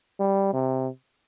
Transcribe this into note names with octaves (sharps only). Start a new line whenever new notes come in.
G3
C3